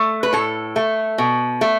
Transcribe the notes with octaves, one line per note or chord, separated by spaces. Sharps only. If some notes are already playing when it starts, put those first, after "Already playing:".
Already playing: A3
B4
A2 A4
A3
B2
A3